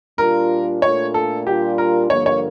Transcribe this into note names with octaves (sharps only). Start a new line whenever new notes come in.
A#2 G3 D4 F4 A#4
A#2 A3 D4 F4 C#5
A4
A#2 G3 D4 F4 G4
A#4
G2 D3 F3 A#3 C#5
C#5